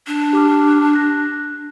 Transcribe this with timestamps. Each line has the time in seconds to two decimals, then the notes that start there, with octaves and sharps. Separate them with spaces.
0.07 D4
0.33 G4 D6 F6
0.93 F#6 A#6